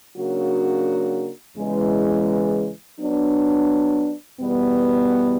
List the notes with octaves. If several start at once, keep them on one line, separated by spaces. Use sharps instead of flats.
C#3 F#3 A#3 D4 F#4
E2 C#3 E3 G#3
F#3 B3 D4
E2 B2 G3 B3